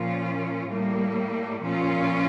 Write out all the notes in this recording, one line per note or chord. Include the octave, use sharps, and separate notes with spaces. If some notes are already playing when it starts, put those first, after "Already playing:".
Already playing: A#2 F3 C#4 F4
A2 G3 A#3
A#2 F3 C#4 F4